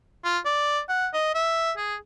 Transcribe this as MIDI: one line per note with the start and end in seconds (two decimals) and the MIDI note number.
0.24 0.39 65
0.45 0.80 74
0.89 1.07 78
1.14 1.33 75
1.35 1.72 76
1.77 1.96 68